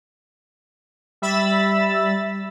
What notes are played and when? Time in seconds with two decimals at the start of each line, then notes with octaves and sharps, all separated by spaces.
1.22 G3 E5 B5 E6 A6